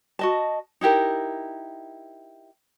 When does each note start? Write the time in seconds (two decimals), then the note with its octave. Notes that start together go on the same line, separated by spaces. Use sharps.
0.19 F#4 D#5 A5
0.81 D#4 E4 G4 A#4